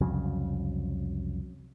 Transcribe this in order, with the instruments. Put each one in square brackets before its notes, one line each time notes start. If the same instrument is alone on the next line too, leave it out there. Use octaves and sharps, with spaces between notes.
[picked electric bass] C2 F2 C#3 F#3